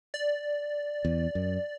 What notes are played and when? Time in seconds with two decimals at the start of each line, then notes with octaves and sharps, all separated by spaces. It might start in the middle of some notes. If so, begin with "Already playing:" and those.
0.14 D5
1.05 E2
1.35 F#2